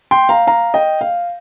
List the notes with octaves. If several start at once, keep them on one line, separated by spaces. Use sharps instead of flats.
G5 C6
F5 A#5
F5 A#5
D#5 G5
F5